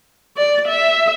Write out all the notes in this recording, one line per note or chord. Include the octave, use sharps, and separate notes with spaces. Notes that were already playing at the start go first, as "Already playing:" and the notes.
D5
E5